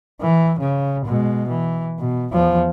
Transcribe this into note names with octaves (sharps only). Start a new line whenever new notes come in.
E3
C#3
B2 G#3
E3
B2
E2 F3